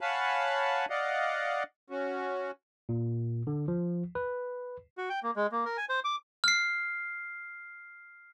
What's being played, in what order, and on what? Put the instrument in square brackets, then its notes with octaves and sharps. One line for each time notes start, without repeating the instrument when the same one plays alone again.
[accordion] C#5 F5 F#5 G#5 A5 B5
D5 D#5 F5 F#5
C#4 F#4
[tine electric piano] A#2
D3
F3
B4
[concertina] F#4
G5
A#3
G#3
A#3
A#4
G#5
C5
D6
[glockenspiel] F6 C7